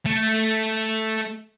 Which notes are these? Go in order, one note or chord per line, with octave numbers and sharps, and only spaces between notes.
A3